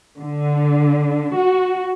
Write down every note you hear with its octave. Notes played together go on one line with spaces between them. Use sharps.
D3
F#4